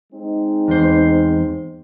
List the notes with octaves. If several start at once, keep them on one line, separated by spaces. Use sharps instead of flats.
G#3 C4 D#4
E2 C5